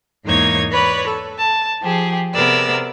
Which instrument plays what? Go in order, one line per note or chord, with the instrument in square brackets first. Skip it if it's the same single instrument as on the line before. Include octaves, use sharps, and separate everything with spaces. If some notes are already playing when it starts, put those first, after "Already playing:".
[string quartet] E2 G#2 A#3 D#4 C#5 G#6
B4 C#5 D5 B5
A4
A5
F3 G4 G#4
C3 B3 G#4 A#4 D5 E6